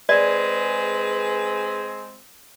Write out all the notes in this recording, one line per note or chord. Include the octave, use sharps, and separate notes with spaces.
G#3 C4 G#4 B4 D5